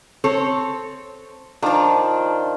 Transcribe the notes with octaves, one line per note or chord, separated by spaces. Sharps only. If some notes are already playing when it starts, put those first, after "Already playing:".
C4 A4 C#5
D#3 F3 D4 F4